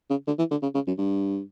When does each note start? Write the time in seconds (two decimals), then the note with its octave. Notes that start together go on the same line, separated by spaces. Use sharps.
0.10 C#3
0.27 D3
0.39 E3
0.51 D3
0.63 C#3
0.75 C#3
0.87 F#2
0.98 G2